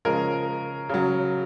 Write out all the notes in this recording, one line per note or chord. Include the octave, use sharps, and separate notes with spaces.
C#3 F3 G#3 A#4
C#3 F#3